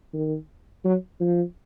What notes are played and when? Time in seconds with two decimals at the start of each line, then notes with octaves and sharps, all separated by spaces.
0.14 D#3
0.85 F#3
1.20 F3